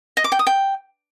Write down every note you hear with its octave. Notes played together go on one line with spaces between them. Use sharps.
D#5
D6
G5
D#6
G5